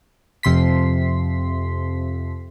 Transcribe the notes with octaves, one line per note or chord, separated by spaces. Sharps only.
F2 C3 C6 B6